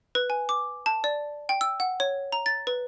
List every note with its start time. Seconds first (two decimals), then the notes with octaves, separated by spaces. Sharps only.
0.15 B4
0.30 G#5
0.49 D6
0.86 A5
1.04 D5
1.49 G5
1.61 E6
1.80 F#5
2.00 C#5
2.32 A#5
2.46 A6
2.67 B4